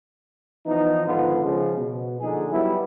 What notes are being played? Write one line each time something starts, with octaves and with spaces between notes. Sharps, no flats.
E3 F3 B3 D#4
G#2 D3 D#3 F3 B3 F4
C#3 F3 G#3
B2
A#1 D3 D#4 G#4
F#3 G3 B3 E4